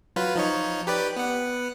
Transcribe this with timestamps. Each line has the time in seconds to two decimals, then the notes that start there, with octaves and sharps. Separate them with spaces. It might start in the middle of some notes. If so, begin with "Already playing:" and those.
0.16 F#3 F4 B4
0.35 F3 D#4 C#5
0.87 G4 B4 D5
1.16 B3 F#5